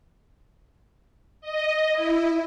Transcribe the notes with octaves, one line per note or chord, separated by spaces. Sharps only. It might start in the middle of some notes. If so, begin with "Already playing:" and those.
D#5
E4